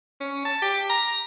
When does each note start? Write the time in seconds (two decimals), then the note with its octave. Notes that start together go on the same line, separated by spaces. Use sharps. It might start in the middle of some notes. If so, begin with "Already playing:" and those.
0.21 C#4
0.45 A5
0.62 G4
0.90 A#5